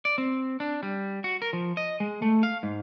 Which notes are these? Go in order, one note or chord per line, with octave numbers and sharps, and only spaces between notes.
D5
C4
D4
G3
F#4
A#4
F3
D#5
G#3
A3
F5
G#2